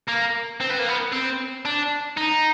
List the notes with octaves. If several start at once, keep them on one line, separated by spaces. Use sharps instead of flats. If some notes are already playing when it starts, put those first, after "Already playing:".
A#3
C4
B3
A#3
B3
C4
D4
D#4